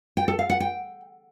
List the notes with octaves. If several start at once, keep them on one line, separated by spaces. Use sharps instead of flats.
G5
A4
F5
F#5
G5